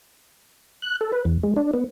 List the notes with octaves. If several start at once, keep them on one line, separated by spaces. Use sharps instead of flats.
F#6
A4
B4
E2
G#3
D4
B3